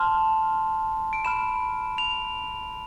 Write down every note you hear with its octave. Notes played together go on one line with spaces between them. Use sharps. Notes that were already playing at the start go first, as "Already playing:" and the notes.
Already playing: A5 C6 F6
D7
B5 F6 E7
F7